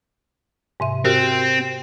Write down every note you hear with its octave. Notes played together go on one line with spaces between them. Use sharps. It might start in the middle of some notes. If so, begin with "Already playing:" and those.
G#2 C3 E5
C4 F#4 G4 A#4